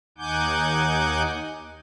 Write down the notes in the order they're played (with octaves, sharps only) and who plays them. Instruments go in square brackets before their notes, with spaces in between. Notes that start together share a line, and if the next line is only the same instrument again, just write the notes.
[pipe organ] D#2 D#4 F#5 G#5 D6 G6